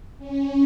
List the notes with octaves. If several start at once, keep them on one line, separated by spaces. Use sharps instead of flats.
C#4